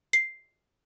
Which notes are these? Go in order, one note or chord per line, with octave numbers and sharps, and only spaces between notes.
C7